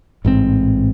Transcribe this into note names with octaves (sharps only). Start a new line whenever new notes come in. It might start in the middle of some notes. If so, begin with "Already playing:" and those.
A1 G#2 B2 C4